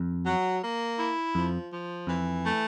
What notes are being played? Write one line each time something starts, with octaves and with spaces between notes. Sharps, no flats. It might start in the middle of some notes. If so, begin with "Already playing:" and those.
Already playing: F2
F#3
A#3
E4
F2 F3
F3
F2 E3
A3